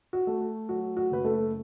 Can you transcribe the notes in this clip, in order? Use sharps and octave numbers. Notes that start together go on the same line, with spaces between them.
F#4
A3
F#3 F#4
F#4
F#1 B4
A3 A4